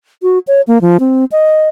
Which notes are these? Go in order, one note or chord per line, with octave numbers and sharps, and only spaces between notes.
F#4
C#5
A#3
F3
C4
D#5